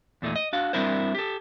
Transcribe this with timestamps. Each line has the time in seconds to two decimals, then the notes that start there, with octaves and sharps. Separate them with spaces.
0.22 E2 A#2 A3 D#4
0.36 D#5
0.53 D4 F#4 F5
0.73 G3 C4 D4 E4 A#4 C5
1.15 G4 A4